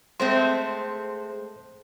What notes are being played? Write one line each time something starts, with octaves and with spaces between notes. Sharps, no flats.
G#3 A3 C4 C5 C6